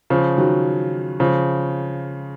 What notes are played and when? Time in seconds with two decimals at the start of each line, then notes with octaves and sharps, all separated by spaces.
0.10 C#3 F3
0.38 D#3 F#3
1.20 C#3 F3